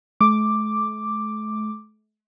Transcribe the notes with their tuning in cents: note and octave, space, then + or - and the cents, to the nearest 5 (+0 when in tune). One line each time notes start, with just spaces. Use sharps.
A3 -45 D6 +0